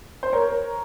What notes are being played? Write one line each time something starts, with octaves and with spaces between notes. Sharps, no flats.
C5
A#4 C#5